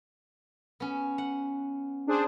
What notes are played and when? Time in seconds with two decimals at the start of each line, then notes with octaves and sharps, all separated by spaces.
0.80 B3 C#4
1.18 F#5
2.07 D4 G#4 C5